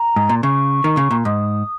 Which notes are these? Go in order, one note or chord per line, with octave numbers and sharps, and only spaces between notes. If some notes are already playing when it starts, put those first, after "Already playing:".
Already playing: A#5
G#2
A#2
C#3 C#6
D#3
C#3
A#2
G#2 D#6